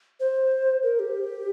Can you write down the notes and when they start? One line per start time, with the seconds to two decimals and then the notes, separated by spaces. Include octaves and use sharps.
0.20 C5
0.83 A#4
0.99 G4